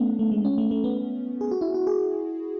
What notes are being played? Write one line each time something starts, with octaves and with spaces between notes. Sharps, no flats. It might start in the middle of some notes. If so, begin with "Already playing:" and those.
Already playing: A3 B3 C#4 D4
A3
G#3
C#4
A3
A3
B3
G#4
F#4
E4
F#4
G#4